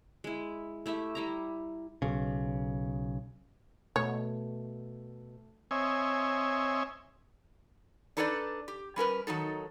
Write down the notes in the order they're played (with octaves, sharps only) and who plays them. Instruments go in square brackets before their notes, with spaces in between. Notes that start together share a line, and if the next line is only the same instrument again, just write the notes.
[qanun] G#3 E4
A3 E4 G4 E5
G3 E4 A#5
[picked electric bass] B1 C#3
[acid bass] B2 [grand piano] A3 [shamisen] C#5
[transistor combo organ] C4 C#5 D#5 E5 G#5
[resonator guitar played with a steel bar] D4 D#4 A4 B4 C#5 D5
G4
G3 C#4 A#4 B4
D#3 F#3 D#4 A4